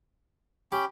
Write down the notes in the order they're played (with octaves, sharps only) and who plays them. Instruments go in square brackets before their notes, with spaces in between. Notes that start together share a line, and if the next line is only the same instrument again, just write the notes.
[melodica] C#4 G5 B5 [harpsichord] G4